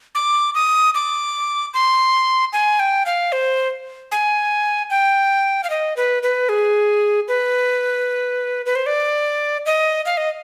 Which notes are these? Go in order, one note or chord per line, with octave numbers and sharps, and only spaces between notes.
D6
D#6
D6
C6
G#5
G5
F5
C5
G#5
G5
F5
D#5
B4
B4
G#4
B4
B4
C5
D5
D#5
F5
D#5